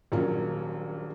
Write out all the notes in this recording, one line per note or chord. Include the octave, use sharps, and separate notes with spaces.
D#1 A#1 F#3 C#4 F4 A#4